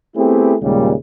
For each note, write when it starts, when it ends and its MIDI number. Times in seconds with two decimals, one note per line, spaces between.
0.16 0.55 57
0.16 0.55 59
0.16 0.55 60
0.16 0.55 64
0.16 0.55 67
0.16 0.55 68
0.61 0.93 39
0.61 0.93 46
0.61 0.93 49
0.61 0.93 55
0.61 0.93 56